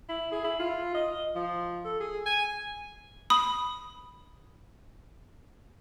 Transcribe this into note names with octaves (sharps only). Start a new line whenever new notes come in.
E4
G#4
E4
F4
D#5
F3
A4
G#4
G#5
B5 D#6